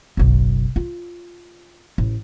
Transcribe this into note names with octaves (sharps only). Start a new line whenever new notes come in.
F#1 B1
F4
A1